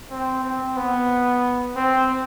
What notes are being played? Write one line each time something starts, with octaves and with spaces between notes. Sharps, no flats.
C4
C4
B3
C4